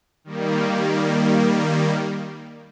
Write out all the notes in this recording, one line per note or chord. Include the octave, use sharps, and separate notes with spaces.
D#3 G3 A#3